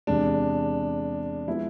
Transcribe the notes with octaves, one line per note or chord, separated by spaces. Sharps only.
E2 C3 G#3 D4
F3 G#3 B3 E4